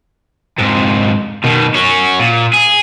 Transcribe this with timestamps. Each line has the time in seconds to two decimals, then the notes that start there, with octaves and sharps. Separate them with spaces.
0.58 F2 G#2
1.44 B2 D#3
1.75 C#4 F#4
2.19 A#2
2.53 G#4